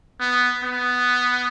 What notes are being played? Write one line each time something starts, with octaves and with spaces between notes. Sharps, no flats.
B3
B3